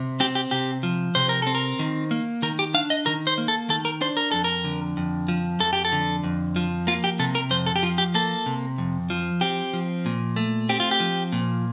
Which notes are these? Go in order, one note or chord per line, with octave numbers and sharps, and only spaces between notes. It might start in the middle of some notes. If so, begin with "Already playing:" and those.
Already playing: C3
C4 G4
G4
C3 G4
F3
C3 C5
A#4
C4 A4
A#4
D#3
A#3
D#3 A#4
G4
D4 F5
D#5
D#3 A#4
C5
A#3
A4
D#3 A4
A#4
D4 C5
A#4
F2 A4
A#4
D3
F2
F3
F2 A4
G4
A4
D3
F2
F3
A#3 F4
G4
C3 A4
A#4
F2 C5
A4
G4
F3 F4
G4
A#3 A4
C3
F2
F3
C4 G4
F3
A#2
A3
C4 G4
F4
G4
F3
A#2